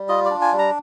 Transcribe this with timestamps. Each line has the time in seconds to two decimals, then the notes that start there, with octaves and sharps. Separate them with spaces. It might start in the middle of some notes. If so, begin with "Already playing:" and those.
Already playing: G3
0.08 F4 D#5
0.25 D5
0.31 D4
0.41 G#5
0.53 G3
0.59 A#5